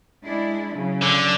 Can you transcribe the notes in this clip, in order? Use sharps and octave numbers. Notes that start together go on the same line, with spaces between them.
G#3 D4 E4
C#3 F#3
D3